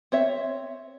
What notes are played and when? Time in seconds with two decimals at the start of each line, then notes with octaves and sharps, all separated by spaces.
0.12 C4 C#5 E5